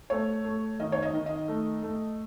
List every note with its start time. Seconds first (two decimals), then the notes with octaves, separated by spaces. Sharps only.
0.10 A3 C#5
0.44 A3
0.80 D#3 D#5
0.92 C#5
1.02 D#5
1.14 D#3
1.26 D#5
1.48 A3
1.82 A3